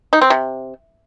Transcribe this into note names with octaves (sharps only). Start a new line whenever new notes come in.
D#4
C4
C3